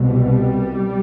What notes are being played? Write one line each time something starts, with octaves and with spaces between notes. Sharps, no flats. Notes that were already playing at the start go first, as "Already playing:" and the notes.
Already playing: C2 B2
G3